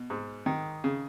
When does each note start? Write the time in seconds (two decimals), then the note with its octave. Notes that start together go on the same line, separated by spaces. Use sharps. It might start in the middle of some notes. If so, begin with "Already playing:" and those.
Already playing: B2
0.10 G#2
0.46 D#3
0.84 C#3